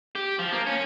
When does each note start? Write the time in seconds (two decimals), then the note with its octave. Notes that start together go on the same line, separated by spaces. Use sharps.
0.15 G4
0.39 F3
0.52 A#3
0.67 C#4